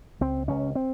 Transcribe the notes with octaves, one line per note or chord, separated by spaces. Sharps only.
C#2 C4
C#2 C#4
C4